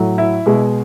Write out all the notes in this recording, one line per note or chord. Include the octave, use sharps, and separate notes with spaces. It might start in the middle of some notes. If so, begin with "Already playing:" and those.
Already playing: A2 F#3
E4
B2 G#3